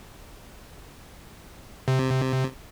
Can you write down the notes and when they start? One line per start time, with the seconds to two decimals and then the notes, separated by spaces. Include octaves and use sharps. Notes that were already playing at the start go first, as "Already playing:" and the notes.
1.88 C3